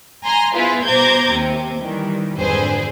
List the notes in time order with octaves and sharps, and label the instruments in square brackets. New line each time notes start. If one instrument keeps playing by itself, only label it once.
[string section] G#5 A#5 C6
B3 E4 F4 G#4 B4 C5
B2 C5 A#5 D6 G6 G#6
D#2 C3
D#3 E3 G3
G#1 F2 D3 G#4 B4 C5